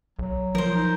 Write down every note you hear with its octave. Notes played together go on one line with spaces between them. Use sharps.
B1 F#3
F3 A#4 C5
D#4